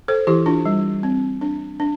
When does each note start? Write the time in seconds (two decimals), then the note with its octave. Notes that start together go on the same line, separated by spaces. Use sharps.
0.08 A4 C5
0.27 E3 E4 G4
0.46 D4 F4
0.66 G3
1.03 C4
1.41 D4
1.80 D4